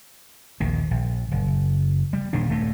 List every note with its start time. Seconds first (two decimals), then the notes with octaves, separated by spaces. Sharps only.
0.60 A#1 D#2 D#3
0.91 A#1
1.31 F#1
2.13 G3
2.33 D#1 A#2 D#3 D4
2.50 D#1 G2 A3